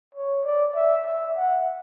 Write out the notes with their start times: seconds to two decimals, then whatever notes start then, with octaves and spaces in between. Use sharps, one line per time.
0.15 C#5
0.45 D5
0.75 E5
1.05 E5
1.37 F#5